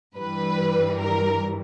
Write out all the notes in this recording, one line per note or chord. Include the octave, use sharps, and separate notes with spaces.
G2 E3 G3 B4
A#4